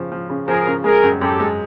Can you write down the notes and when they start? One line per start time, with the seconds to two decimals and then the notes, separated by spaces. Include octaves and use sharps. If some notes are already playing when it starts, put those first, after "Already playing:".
Already playing: C#3 F3
0.12 F3
0.30 C#3
0.48 F3 G#4 A#4
0.67 C#3
0.84 G#3 G#4 A#4
1.03 F#2
1.21 F#2 G4 A4
1.40 G#3